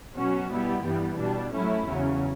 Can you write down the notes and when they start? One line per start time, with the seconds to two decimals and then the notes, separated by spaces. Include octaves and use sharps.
0.17 B2 F#3 C#4 F#4
0.51 B2 G3 B3 E4 G4
0.84 G2 E3 G3 B3
1.19 B2 G3 D4
1.53 A2 F#3 A3 C#4 E4
1.87 E2 C#3 F#3 C#4